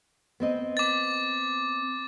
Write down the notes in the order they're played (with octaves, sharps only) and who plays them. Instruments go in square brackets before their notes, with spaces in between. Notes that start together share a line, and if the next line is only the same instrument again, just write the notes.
[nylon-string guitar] B3 C4 D#5
[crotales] D6 A6